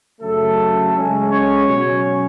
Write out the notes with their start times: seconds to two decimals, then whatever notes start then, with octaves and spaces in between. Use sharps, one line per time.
0.20 F#2 C#3 F#3 A3 C#4 A4
0.93 C#3 G#3 C#4
1.30 C#4 C#5
1.66 B2 F#3 C#4